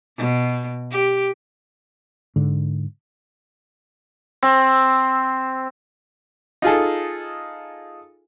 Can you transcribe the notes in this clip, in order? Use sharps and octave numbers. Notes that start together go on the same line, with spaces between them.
B2
G4
G#2 D3
C4
D#4 F4 G#4 A4